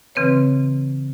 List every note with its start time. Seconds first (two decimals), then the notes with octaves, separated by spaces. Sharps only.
0.15 C#3 E3 C4 B4 C#5